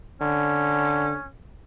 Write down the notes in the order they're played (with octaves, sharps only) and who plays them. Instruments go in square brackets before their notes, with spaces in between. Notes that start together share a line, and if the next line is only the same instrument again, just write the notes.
[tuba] D3 [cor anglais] C#4